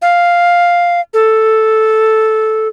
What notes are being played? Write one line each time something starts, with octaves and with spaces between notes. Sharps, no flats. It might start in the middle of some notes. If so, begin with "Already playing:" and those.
F5
A4